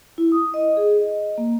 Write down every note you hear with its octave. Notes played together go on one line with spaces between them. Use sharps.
E4
D#6
D#5
G#4
D#5
A#3